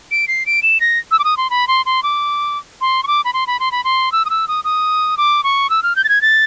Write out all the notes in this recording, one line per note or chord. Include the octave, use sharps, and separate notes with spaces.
D7
C7
D7
E7
A#6
E6
D6
D#6
C6
B5
C6
C6
D6
C6
C#6
D6
B5
C6
B5
C6
B5
C6
E6
D#6
E6
D#6
D#6
D6
C#6
E6
F6
G6
A6
G#6
A6